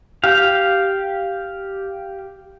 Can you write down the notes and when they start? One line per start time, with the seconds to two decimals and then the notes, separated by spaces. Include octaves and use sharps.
0.24 G4 F5